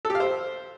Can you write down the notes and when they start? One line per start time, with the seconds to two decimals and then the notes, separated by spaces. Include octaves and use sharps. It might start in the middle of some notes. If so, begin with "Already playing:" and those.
0.05 A4
0.10 G4
0.15 F5
0.20 C5